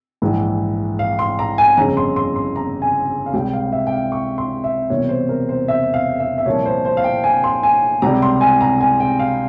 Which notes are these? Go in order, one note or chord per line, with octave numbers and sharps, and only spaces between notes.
A#1 G#2 E3
F5
C6
A#5
G#5
G1 F2 C#3 A#5
C6
C6
C6
A#5
G#5
F5
C#2 C3 G3 G5
F5
E5
G5
F5
C#6
C6
E5
E1 E2 C3 G3 A#3 C#5
C5
A#4
C5
E5
F5
E5
E5
C2 A#2 F3 A#3 C#5
C5
C5
F5
G5
G#5
C6
G#5
C#2 C3 G3 A#5
C6
G#5
A#5
G#5
G5
F5